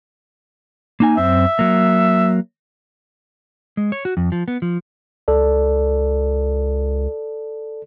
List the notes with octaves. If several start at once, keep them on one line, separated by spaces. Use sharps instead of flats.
A#3 D#4 G#5
F#2 C4 E5
F#3 A#3
G#3
C#5
F#4
F2
F3
B3
F3
C#2 A4 D5